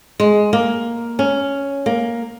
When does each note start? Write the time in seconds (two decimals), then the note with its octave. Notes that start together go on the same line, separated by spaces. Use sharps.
0.20 G#3
0.53 A#3
1.19 C#4
1.86 A#3